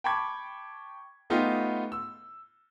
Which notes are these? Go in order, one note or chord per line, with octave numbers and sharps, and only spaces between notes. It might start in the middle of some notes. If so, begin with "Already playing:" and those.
G5 A5 B5 C#6 D6 G#6
A3 B3 D#4 F4 G4
E6